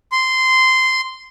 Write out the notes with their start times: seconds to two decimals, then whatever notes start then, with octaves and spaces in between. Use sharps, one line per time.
0.12 C6